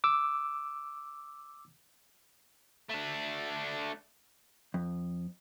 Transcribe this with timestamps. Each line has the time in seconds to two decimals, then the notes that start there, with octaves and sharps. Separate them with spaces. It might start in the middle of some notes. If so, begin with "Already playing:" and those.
0.04 D6 E6
2.90 A3 D4
4.74 F2